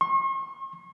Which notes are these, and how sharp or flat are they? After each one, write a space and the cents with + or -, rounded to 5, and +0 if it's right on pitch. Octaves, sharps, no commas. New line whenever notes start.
C#6 -45